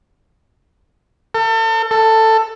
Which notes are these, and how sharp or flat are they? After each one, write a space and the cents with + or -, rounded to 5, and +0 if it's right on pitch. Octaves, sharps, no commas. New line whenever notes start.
A4 +40
A4 +15